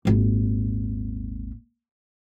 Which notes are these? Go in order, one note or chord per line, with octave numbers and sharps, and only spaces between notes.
D#1 G#1